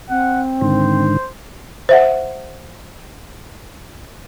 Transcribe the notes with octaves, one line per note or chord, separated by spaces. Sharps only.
C4 F#5
G#2 D3 D#3 C5
C5 E5 F#5